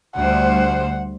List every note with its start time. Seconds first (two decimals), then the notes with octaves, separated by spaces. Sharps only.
0.16 D2 G3 C5 F#5